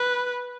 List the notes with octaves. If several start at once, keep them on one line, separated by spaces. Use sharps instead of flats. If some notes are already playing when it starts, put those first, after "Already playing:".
Already playing: B4